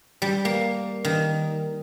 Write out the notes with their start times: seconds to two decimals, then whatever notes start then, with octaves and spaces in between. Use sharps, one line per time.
0.22 G3
0.45 A#3
1.05 D#3